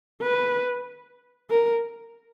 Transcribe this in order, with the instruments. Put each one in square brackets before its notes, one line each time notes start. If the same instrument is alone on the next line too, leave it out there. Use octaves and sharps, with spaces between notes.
[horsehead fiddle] B4
A#4